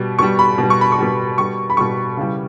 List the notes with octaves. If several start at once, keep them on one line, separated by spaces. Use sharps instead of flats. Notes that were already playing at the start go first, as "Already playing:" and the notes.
Already playing: B2 G3
B2 G3 C#6
B5
B2 G3
C#6
B5
C#6
B2 G3
B2 G3 C#6
B5
B2 G3 C#6
C#3 E3 G3